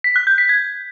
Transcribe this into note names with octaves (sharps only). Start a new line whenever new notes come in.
B6
F#6
G6
B6
G#6